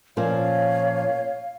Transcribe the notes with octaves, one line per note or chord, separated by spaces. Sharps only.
A#2 F3 C#4 C#5 F5